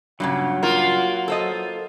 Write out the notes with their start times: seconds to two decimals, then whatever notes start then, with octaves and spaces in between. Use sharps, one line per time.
0.20 G2 A#2 C#3 F#3 F#5
0.63 A#3 F4
1.28 A4 C5 D#5